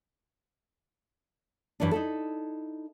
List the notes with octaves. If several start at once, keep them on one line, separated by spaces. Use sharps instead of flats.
G2 E3 C#4 D4
D#4 E4 A4